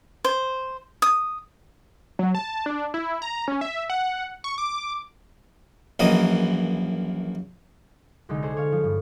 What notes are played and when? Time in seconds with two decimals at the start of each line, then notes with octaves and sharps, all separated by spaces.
0.24 C5
1.02 D#6
2.19 F#3
2.35 A5
2.66 D4
2.94 E4
3.22 A#5
3.48 C#4
3.61 E5
3.90 F#5
4.44 C#6
4.58 D6
5.99 A#1 F#2 E3 A#3 D#5
8.29 C2 D3 G#3 D#4
8.42 D4 G#4 A4 C5 C#5
8.57 C#5 F5
8.72 F3 F4
8.84 G2 F3